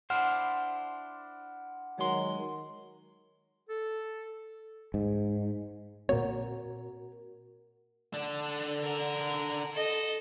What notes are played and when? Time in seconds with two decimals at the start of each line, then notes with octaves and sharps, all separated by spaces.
0.10 D4 E4 C5 F#5 F6
1.99 D#3 F#3 G#3 C6
3.69 A4
4.94 G#2
6.09 A#2 A#3 C4 F#4 A#4 C#5
8.14 D3 D4
8.82 A#4
9.73 A4 D#5